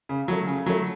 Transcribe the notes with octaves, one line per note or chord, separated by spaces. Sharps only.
C#3
F#3 A3
C#3
F#3 A3